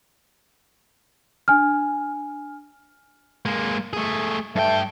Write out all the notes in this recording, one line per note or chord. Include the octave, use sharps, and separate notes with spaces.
D4 G#5 F6
G#3 A#3
A3 G#4
G2 A3 G5